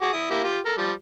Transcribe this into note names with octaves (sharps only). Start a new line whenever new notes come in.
F#4 G#4 D6
E4 D#6
A#3 E4 G4
F4 G4
A4 A#4
F3 G3